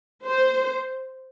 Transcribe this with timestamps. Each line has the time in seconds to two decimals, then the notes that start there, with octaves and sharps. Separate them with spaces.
0.25 C5